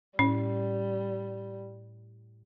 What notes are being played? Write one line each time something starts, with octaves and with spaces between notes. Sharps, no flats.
A2 G3 C#4